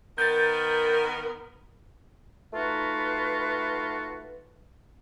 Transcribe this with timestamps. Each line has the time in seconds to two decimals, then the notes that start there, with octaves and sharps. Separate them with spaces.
0.18 D#3 B3 A#4 G6 A6
2.54 A3 D#4 F4 F#4 B4